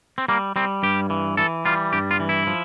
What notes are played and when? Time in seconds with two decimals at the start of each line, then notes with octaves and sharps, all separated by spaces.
0.18 C4
0.28 G3 A#3
0.56 G3 C4
0.83 G2 G4
1.10 E3
1.37 E3 A4
1.65 G3 F4
1.93 G2 G4
2.11 F4
2.20 E3
2.29 E4
2.47 F3